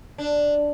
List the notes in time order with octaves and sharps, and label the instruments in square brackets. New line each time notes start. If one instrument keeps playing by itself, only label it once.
[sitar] D4